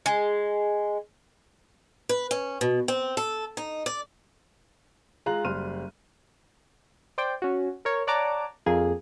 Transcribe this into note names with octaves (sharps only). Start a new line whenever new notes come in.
G#3
B4
C#4
B2
C4
A4
D#4
D5
G#3 F4 A#5 F#6 F#7
F#1 G3 C6 F6 D#7
C5 D5 G5
C#4 F#4
A#4 C#5
C#5 D5 F#5 A5 A#5 D6
F2 A#3 G#4